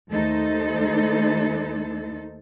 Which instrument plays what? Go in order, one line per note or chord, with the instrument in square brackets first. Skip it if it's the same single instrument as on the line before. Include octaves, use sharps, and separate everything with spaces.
[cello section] D#2 A3 D#4 A4 C5